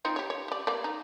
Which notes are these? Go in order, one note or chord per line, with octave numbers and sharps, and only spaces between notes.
C4 D#4 F4
G4 C#5
C#5
G4 D5
A#3 B3 D5
D#4